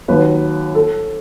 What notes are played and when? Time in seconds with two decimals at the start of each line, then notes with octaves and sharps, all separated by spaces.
0.08 D#2 D#3 F#3 B4
0.75 A4